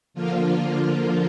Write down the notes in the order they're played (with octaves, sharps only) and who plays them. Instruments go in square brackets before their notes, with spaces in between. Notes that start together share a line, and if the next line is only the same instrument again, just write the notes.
[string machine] D3 F3 A#3 F4